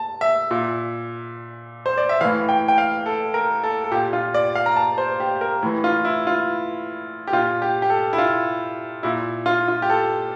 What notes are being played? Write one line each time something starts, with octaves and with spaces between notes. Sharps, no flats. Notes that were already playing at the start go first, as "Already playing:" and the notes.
Already playing: A5
E5
A#2
C5
D5
E5
A2 E3 F5
G5
G5
F5
A4
A#4
A4
A4
A#2 G4
F4
D5
F5
A#5
A5
C5
G4
A#4
A2 E3
F4
E4
F4
G4
A#2 F4
G4
G4
A4
E4
F4
A#2 E4
F4
F4
G4
A4